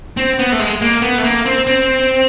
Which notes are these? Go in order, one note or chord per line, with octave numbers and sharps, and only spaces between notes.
C4
B3
A3
G#3
A#3
B3
A3
A#3
C4
C4